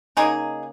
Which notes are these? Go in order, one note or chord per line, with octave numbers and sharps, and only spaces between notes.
C#3 A#3 D#4 G#4